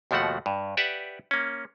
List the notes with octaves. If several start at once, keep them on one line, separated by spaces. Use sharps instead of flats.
D#2 B2 F3 A3 F#4 F#5
G2
G4 B4 D5 E5 F#5
A#3 C#4